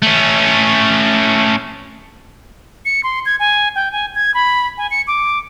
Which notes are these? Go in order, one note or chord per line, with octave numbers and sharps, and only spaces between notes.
A3 C#4
C#7
C6
G#6
G#5
G5
G#5
G#6
B5
G#5
C#7
D6